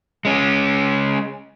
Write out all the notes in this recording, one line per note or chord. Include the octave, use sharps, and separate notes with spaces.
G#3 C#4